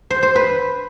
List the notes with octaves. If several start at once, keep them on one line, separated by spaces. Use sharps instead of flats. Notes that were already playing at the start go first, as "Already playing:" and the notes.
C5
C5
B4